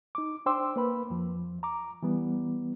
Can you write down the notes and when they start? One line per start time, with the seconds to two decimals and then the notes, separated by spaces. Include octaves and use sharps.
0.15 D#4 D6
0.46 D4 C5 G5 C6 D6 E6
0.76 A#3 B4 B5
1.10 F2 F3
1.63 A#5 D6
2.03 E3 G3 B3